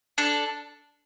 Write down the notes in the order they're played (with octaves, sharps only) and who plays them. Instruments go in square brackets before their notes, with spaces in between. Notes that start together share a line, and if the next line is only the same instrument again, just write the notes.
[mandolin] D4 A4